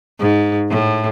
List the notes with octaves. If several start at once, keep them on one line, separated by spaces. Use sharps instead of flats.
G#2
A2